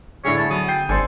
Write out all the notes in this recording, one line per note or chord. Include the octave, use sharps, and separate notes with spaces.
A2 D3 G#4 C#5
B3 A5
F#3 D#6
G5 G6 C7
G#1 D4 A4 C5 D5 G#5